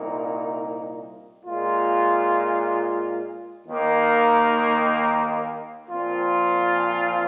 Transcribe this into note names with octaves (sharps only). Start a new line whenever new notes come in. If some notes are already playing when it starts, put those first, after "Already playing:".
Already playing: C2 A#2 A#3 D#4
A#2 G#3 F4
D#2 D#3 A#3 D#4
A#2 F3 C4 F4